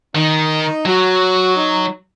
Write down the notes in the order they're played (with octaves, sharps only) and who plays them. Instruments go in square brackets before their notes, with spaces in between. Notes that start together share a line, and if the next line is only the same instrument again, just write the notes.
[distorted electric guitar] D#3 [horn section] D#4
[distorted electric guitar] F#3 [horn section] F#4
[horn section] D#4